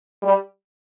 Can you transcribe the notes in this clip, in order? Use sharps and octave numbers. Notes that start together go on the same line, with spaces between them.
G3